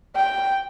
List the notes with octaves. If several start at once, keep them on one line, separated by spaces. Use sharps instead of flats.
G5